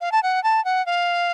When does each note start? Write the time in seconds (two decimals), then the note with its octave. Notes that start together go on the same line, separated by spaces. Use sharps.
0.01 F5
0.12 A5
0.23 F#5
0.44 A5
0.65 F#5
0.86 F5